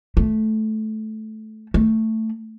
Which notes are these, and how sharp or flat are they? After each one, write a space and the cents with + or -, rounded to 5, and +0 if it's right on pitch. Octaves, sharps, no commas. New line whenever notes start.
A3 -15
A3 +10